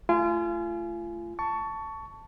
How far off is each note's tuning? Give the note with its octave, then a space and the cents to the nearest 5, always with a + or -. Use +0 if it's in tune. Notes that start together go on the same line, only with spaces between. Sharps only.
A3 +0 F4 -35 G#5 +20
A5 +5 C#6 +20